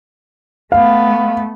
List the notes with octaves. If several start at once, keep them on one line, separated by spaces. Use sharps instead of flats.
A3 B3 F5